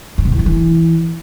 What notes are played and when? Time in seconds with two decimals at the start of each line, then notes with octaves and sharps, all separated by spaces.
0.18 G2
0.25 B2
0.32 E2
0.39 G2
0.46 E3